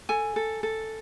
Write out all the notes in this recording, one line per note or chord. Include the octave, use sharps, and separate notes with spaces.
A4 G#5
A4
A4